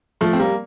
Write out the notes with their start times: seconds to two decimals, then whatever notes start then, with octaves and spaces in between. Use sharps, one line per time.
0.21 F3 A3
0.33 C4
0.40 G3 A#3